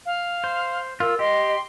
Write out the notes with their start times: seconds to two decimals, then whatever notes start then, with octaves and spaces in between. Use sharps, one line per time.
0.05 F5
0.44 C5
1.00 F4 A#4 E6
1.19 G4 D#5 C6